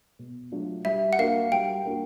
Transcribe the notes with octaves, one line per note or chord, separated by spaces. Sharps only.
B2
F#3 A3 D4 F4
G3 E5
F#5
A#3 D4 F#4 F5
G3 G5
A#3 D4 F#4